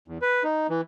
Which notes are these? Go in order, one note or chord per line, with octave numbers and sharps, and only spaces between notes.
E2
B4
D#4
E3